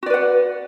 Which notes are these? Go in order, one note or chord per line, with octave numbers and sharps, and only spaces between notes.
F#4 B4 D5 F#5